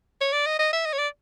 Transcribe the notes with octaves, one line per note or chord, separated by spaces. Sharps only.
C#5
D5
D#5
D#5
E5
D#5
C#5
D5